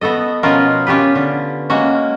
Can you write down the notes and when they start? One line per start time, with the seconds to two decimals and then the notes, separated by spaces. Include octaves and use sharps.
0.01 B3 F#4 A4 D#5
0.43 B2 F3 B3 C#4 F4 A#4
0.87 C#4 F4 G4 B4
1.15 D3
1.70 G#3 A#3 C#4 F#4